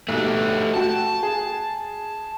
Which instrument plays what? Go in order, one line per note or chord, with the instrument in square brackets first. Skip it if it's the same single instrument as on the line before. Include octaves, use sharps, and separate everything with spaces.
[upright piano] B1 [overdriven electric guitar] A3 G4
[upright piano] F#4 G5 [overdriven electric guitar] A5
[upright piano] G#4